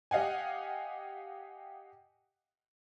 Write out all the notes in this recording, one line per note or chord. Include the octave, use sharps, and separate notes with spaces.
G4 D#5 F5 F#5 G#5